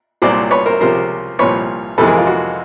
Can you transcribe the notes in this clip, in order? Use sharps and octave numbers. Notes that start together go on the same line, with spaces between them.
C2 A#2 F#3 C5 D5
B4 C#5
A#4 C5
C#2 C3 F3 A#4 C5
C2 A#2 F3 B4 C#5
F2 C3 E3 G#3 A4 B4
G#4 A#4
F4
F#4